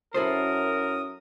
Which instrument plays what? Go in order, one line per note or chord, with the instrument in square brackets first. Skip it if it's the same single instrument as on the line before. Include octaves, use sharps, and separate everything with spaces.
[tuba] F#2 [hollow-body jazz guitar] E4 A4 C5 [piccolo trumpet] A#4 [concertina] D#6